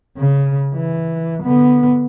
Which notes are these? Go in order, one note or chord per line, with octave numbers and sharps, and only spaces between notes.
C#3
E3
D3 B3